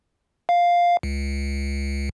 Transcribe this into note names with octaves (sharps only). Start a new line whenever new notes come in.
F5
C#2